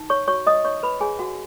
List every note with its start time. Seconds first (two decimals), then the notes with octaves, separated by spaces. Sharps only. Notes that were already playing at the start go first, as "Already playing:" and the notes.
Already playing: D#4
0.10 C#5 C#6
0.28 F#4 C#5 C#6
0.47 D#5 D#6
0.64 D#4 C#5 C#6
0.83 B4 B5
1.01 G#4 C#5 G#5
1.19 F#4 F#5